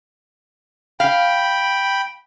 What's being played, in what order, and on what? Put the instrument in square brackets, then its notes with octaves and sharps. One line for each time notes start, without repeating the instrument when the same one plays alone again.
[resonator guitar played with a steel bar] F5 [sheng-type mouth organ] G5 B5